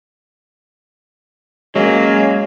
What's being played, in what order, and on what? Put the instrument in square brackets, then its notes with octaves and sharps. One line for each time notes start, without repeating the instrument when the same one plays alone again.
[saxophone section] B2 F#3 A#3 [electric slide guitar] G#3 [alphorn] C#4